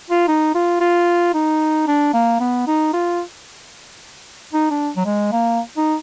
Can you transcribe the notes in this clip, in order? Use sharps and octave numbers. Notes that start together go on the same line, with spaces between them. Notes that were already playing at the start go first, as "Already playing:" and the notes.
F4
D#4
F4
F4
D#4
D4
A#3
B3
D#4
F4
D#4
D4
F#3
G#3
A#3
D#4